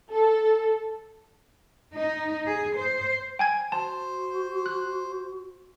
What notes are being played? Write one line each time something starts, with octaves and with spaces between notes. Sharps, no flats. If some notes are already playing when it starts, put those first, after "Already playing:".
A4
D#4
G#4
C5
G5 G#5 G#6
F#4 C5 A5
F#6